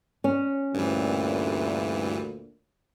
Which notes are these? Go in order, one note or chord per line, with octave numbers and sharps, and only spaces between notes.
C#4
D2 G2 A#2 E3